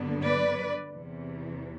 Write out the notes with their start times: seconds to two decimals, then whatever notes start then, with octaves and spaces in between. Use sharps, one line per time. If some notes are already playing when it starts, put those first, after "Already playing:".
Already playing: G2 D3 F#3 B3
0.24 B4 D5
0.93 E2 C3 E3